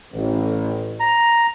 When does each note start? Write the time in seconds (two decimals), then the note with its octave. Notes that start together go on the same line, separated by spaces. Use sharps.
0.13 A1
1.00 A#5